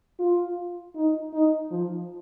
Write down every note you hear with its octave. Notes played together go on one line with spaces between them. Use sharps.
F4
D#4
D#4
F3